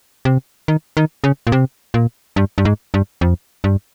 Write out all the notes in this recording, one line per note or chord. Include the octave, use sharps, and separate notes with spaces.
C3
D#3
D#3
C#3
A#2
C3
A#2
G2
G2
G#2
G2
F2
G2